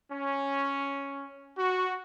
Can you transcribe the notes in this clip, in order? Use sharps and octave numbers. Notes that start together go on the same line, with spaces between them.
C#4
F#4